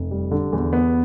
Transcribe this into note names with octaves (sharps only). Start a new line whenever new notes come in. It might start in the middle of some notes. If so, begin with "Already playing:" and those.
Already playing: F1
G3
D3
E2
B3